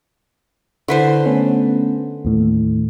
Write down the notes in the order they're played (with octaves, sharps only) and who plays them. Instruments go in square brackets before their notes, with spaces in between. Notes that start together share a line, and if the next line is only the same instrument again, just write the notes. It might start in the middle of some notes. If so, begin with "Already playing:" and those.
[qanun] D3 B4 C5 [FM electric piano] E4
[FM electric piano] A3 B3 C#4
D#2 A2